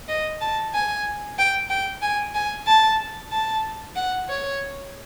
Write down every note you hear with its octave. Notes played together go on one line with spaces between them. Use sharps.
D#5
A5
G#5
G5
G5
G#5
G#5
A5
A5
F#5
C#5